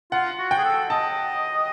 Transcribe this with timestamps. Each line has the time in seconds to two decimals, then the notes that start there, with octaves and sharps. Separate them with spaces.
0.12 F4 F#5
0.39 F#4
0.51 G5
0.58 G#4
0.64 A4
0.90 D#5 A5